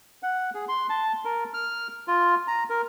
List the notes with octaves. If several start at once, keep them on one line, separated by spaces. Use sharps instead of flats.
F#5
G#4
C6
A5
A#4
F6
F4
A#5
A#4